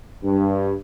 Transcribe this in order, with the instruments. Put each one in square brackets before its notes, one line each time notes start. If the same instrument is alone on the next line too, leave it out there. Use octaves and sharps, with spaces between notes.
[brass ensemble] G2